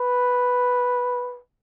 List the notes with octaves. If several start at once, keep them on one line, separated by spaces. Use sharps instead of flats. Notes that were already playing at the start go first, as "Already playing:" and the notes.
Already playing: B4